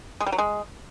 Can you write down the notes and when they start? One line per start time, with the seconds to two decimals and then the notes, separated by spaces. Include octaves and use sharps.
0.21 G#3
0.26 G3
0.32 F#3
0.38 G#3